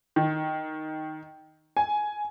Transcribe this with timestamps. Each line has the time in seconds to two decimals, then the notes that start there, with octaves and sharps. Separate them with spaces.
0.16 D#3
1.77 G#5